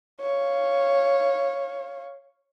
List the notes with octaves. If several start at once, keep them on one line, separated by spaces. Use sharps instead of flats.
C#5 F5